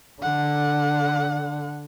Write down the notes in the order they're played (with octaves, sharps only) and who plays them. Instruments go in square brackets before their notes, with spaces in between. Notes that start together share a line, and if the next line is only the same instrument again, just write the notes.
[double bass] D3 [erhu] F#5